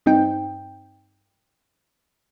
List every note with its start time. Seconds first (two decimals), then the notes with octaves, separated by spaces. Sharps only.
0.06 G2 C4 D#4 G5